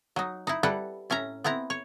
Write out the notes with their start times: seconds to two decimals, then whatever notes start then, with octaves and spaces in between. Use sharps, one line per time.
0.16 F#3 D#4
0.47 D#4 E4
0.63 G3 E4 A4 B4 F#5 G5
1.10 A2 C#4 E5 A#5
1.44 B3 C4 E4 A#5
1.70 C#5